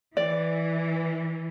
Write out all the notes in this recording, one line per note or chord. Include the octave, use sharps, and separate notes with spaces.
E3 D5